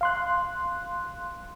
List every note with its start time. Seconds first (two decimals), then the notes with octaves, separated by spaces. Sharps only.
0.01 F5 C6 F#6